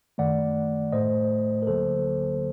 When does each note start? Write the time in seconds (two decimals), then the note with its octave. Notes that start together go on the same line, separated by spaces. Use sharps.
0.18 F#2 D#3 A3 D5 F#5
0.92 A2 A3 C5 D#5
1.62 A#4
1.67 D2 D3 F#3 A#3 A4 C5